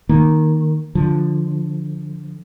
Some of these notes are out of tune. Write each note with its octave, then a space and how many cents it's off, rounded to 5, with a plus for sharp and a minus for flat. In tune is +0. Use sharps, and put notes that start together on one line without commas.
D#3 +0 A#3 +0
D3 +0 F3 +0